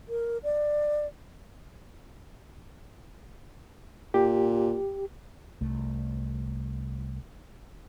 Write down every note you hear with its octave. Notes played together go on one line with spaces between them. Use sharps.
A#4
D5
A#2 G4
C2 A3